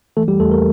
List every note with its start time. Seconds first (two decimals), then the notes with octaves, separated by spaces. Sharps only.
0.17 E3 A3 A4
0.28 G3 G4
0.40 E2 A3 A4
0.51 A#3 A#4